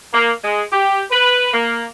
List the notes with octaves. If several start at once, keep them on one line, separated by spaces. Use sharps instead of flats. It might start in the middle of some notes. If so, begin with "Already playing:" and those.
A#3
G#3
G4
B4
A#3